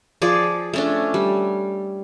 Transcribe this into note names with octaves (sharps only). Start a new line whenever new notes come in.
F3 G#4 D5
A3 C#4 D4
G3